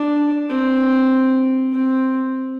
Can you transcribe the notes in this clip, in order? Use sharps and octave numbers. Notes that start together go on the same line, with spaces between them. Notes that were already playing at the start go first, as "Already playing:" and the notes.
Already playing: D4
C4
C4